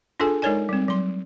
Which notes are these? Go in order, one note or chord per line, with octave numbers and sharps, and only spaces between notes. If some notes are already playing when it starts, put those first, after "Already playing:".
D4 F4 G#4 A4 G#5
G#3 D#4 A#4 C#5 D5 G#5
G3 C4
F#3 C6